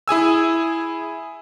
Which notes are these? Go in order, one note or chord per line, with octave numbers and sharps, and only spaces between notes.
E4 G#4 G#5 E6